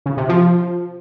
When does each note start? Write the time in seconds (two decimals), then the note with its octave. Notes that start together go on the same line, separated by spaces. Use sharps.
0.06 C#3
0.17 C3
0.29 F3